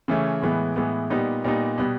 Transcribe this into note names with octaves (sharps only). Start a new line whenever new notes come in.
C#3 E3 A3 C#4
A2 E3 G#3 B3
A2 E3 G#3 B3
A#2 G3 B3 D#4
A#2 G3 B3 D#4
B2 G3 B3